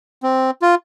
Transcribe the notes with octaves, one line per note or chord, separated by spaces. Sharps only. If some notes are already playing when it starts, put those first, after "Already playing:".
C4
F4